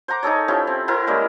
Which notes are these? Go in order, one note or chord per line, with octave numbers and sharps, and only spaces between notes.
C5 F#5 A#5 D6
D#4 G#4 A4 C#5
F3 C#4 E4 G4
C4
C4 E4 A#4 F#5
G3 G#3 A#3 C#4